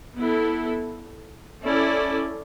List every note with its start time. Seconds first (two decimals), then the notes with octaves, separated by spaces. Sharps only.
0.17 B3 E4 A4
1.64 C#4 E4 A4 D5